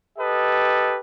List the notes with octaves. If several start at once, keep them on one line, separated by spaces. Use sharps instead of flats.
G4 A4 B4 D#5